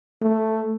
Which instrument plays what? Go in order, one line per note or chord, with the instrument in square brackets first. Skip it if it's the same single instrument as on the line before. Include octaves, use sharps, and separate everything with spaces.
[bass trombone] A3